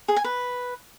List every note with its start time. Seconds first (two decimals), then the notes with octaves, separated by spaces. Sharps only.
0.08 G#4
0.16 G#5
0.24 B4